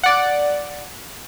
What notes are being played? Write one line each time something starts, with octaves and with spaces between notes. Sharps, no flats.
D5 F#5